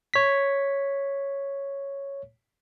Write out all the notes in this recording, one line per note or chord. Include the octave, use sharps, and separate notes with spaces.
C#5 B6